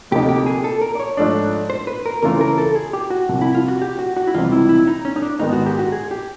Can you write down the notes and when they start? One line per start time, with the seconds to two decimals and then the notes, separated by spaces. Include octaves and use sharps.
0.11 D2 C3 F3 A#3 D#4 G4
0.29 G4
0.46 G#4
0.64 A4
0.81 A#4
0.95 D5
1.00 C#5
1.17 G#2 F3 A3 D4
1.70 C5
1.87 B4
2.06 A#4
2.23 C#3 E3 A3 C#4 F4 A#4
2.41 A#4
2.58 A4
2.75 G#4
2.93 G4
3.10 F#4
3.29 C2 C3 F3
3.41 E4
3.55 F4
3.68 F#4
3.82 G4
3.99 F#4
4.17 F#4
4.27 E4
4.34 C#2 C3 E3 G3 C4 F4
4.52 E4
4.69 E4
4.87 D#4
5.05 C#4
5.16 D#4
5.22 D4
5.39 G#2 D#3 G#3 B3 D#4
5.53 F#4
5.66 G4
5.79 F#4
5.92 G#4
6.11 G4